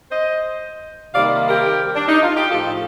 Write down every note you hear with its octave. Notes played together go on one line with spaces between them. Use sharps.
C5 D#5
C3 D#3 G3 A#3 D5 F5
G4 A#4
D4
D#4
F4
G4
A2 F3 A3 F4 A4